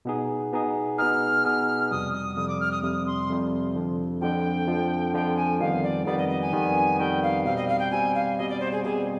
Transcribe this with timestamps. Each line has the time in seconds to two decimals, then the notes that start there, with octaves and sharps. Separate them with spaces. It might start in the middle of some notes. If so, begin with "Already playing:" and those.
0.05 B2 B3 D#4 G#4
0.52 B2 B3 D#4 G#4
0.98 B2 B3 D#4 G#4 F6
1.44 B2 B3 D#4 G#4
1.91 F2 C3 G3 D#6
2.14 D#6
2.36 F2 C3 G3 D#6
2.48 D6
2.60 F6
2.72 D#6
2.83 F2 C3 G3 D#6
3.07 C6
3.30 F2 C3 G3
3.76 F2 D3 F3
4.21 F2 D3 F3 G5
4.68 F2 D3 F3
5.14 F2 D3 F3 G5
5.37 G#5
5.60 F2 D#3 G3 B3 F5
5.83 D5
6.06 F2 D#3 G3 B3 D5
6.18 D#5
6.29 D#5
6.42 G#5
6.53 F2 D#3 G3 B3
6.99 F2 D#3 G3 B3 G5
7.22 F5
7.45 B2 G3 C4 F5
7.57 D#5
7.68 F5
7.79 G5
7.91 B2 G3 C4 G#5
8.15 F5
8.37 B2 G3 C4 D#5
8.49 D5
8.60 C5
8.72 G#4
8.84 B2 G3 C4 G#4